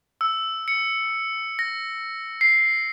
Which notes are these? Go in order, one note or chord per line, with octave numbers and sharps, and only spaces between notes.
E6
C#7
A#6
C7